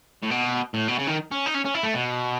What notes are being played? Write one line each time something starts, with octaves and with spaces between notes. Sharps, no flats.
A2
B2
A2
B2
C#3
D#3
C#4
D#4
C#4
C#4
E4
A3
B2